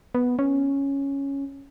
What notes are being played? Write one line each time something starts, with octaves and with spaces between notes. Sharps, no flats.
B3
C#4